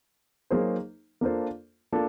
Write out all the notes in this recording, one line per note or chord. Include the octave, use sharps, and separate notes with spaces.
F#3 A#3 D#4 G#4 C5
A#3 D4 F4 A4 C5
A#3 D4 F4 A4